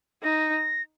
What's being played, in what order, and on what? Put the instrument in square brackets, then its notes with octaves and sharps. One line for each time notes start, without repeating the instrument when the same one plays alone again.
[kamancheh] D#4 [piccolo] A#6